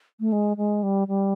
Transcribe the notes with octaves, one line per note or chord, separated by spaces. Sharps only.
A3
G#3
G#3
G3
G3